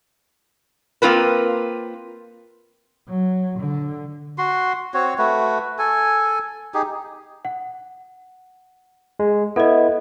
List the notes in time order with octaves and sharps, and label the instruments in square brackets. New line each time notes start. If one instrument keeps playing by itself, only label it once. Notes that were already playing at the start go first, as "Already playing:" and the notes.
[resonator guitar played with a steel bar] A#3 C4 F4 A#4 B4
[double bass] F#3
D3
[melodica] F#4 C6
C4 F#4 C#5
A3 F#4 B4
A4 G#5
D#4 G4 G#4
[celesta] F#5
[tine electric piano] G#3
[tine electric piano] B3 E4 [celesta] A4 D#5